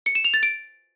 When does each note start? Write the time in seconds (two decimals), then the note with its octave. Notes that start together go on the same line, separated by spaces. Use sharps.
0.06 C#7
0.15 E7
0.24 F7
0.34 A6
0.43 D7